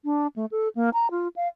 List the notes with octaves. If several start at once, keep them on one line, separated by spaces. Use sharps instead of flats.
D4
A3
A4
A#3
A#5
F4
F5